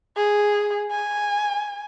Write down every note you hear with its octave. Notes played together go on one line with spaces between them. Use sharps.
G#4
G#5